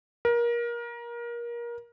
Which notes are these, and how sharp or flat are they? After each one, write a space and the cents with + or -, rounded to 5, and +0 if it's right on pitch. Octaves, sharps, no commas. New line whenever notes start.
A#4 +25